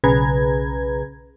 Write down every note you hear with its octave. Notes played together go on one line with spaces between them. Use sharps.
B1 C#3 G#4 B4 A#5 G#6